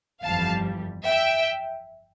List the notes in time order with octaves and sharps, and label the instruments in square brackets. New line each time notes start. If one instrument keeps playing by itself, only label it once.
[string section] G1 F2 E3 G3 F5 A5
E5 G5